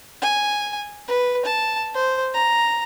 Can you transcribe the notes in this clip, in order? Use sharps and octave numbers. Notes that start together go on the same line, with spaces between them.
G#5
B4
A5
C5
A#5